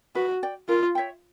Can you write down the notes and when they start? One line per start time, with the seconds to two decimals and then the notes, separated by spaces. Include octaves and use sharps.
0.15 F#4 B4
0.43 D5 G5
0.68 F4 A#4
0.95 C#5 E5 G5